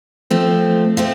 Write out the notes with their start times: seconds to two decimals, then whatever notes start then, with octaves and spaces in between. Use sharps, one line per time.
0.30 F3 A3 C4
0.97 F3 A3 C4